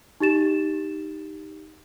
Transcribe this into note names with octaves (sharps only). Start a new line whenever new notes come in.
D#4 G4 A6 E7